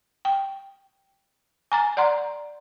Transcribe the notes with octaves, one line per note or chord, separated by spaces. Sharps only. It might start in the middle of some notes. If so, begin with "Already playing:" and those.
G5
G#5 A#5 A6
D5 F#5 A#5 C6